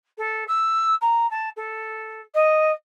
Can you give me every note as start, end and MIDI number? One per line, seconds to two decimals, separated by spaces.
0.18 0.44 69
0.48 0.95 88
1.01 1.29 82
1.31 1.49 81
1.56 2.21 69
2.34 2.71 75